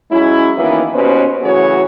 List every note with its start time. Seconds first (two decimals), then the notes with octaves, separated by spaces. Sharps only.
0.11 F#3 G#3 C#4 E4
0.58 F#2 D#3 E3 A#3 B3 E4
0.94 D#2 B2 C#4 B4 C5
1.42 C#3 E3 F#3 A3 F#4 C#5